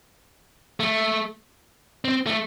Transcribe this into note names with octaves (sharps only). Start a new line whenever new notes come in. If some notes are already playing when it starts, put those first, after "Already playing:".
A3
C4
A3